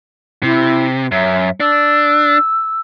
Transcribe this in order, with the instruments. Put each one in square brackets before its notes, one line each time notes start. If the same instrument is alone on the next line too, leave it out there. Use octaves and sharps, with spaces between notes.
[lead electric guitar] C3 [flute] E4
[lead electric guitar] F#2 [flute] E5
[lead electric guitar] D4 [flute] E6